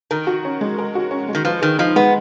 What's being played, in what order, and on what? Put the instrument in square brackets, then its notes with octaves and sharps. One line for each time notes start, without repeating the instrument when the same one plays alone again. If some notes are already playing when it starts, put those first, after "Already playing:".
[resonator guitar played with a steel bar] D#3 [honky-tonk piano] A#4
[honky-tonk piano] F#4
C#4
G#3
A#4
F#4
C#4
G#3
[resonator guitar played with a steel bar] D#3
[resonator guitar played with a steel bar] F3 [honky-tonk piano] B4
[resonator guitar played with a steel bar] D#3 [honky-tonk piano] G#4
[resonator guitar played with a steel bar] F3 [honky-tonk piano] D#4
[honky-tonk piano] G#3 [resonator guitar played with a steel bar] B3